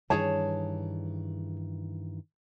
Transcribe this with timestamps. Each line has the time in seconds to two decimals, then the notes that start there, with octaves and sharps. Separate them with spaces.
0.10 G2 D#3 E3 G#4 C#5 A5